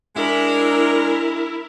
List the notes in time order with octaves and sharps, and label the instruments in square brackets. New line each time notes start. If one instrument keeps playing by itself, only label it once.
[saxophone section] G#3 D4 [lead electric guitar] E4 [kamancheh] A#4